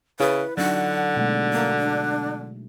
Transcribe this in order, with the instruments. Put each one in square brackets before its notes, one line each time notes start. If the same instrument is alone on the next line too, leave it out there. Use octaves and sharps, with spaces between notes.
[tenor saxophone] C#3 [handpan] E4 [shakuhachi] B4
[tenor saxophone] D3 [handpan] F#3 D4 D#4 [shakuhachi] F#5
[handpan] B2 G#3 A3
[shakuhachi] A#3
D4